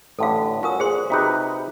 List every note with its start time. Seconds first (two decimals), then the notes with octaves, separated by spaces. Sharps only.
0.19 A1 A2 D3 A4 F5
0.63 C#4 F4 F#4 A#4 D#6
0.80 A#2 G#4 C5 C6
1.10 C3 D#4 F#4 G#4 B4